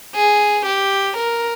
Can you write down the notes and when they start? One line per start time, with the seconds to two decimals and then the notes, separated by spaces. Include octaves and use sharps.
0.15 G#4
0.66 G4
1.18 A#4